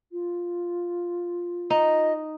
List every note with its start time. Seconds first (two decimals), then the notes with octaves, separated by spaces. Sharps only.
0.12 F4
1.70 D#4 D#5